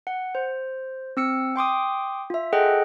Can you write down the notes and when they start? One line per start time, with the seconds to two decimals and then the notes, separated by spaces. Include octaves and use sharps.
0.07 F#5
0.35 C5
1.17 C4 E6 C#7
1.56 G5 C6 D6 D#6
2.30 F4 E5
2.53 G#4 A4 D#5 F#5 G5 F#6